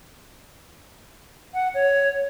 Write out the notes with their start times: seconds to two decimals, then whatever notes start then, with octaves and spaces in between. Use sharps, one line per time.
1.54 F#5
1.74 C#5